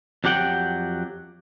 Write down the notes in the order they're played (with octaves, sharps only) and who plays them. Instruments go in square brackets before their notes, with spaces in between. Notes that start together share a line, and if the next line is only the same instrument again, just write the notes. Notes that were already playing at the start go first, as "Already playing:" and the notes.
[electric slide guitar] F2 F#3 G4 F#5 G5